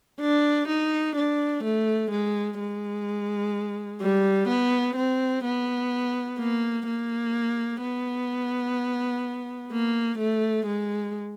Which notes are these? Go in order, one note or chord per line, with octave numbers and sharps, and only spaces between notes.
D4
D#4
D4
A3
G#3
G#3
G3
B3
C4
B3
A#3
A#3
B3
A#3
A3
G#3